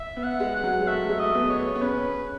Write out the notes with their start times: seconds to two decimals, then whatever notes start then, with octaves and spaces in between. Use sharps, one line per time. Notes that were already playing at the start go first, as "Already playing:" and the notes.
Already playing: E5
0.17 B3
0.24 F#5
0.40 G#3
0.56 F#5
0.64 F#3
0.82 G#3
0.87 A3 E5
1.09 G#3
1.19 A3 D#5
1.35 B3
1.50 C#5
1.75 B3
1.81 C#4 B4